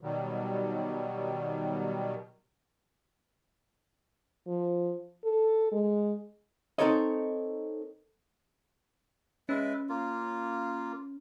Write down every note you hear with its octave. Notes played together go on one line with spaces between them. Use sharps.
B2 D#3 F#3 G3
F3
A4
G#3
C4 D#4 A4 A#4 C#5 D#5
G#3 C#4 B4 E5
A#3 F4